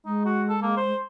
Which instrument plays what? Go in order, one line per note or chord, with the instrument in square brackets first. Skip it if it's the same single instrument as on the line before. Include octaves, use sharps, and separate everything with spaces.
[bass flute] G#3 [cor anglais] D#4
[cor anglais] F#4
A4
A#3
C5